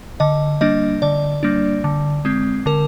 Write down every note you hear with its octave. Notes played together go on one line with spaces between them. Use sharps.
D3 D#5
G3 A#3 D4 D#5
D3 D5
G3 A#3 D4
D3
G#3 C4
D3 A#4